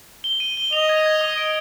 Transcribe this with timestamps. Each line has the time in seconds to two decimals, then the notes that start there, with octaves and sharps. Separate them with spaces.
0.24 G7
0.40 D#7
0.57 G7
0.73 D#5 F7
0.89 G#6
1.06 G#6
1.21 D#6
1.38 D7